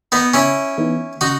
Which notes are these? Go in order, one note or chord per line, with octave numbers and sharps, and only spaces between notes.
B3 D#4
C#3 C#4 E4
E3 B3 D#4 G#4
C#3 D#4 F#4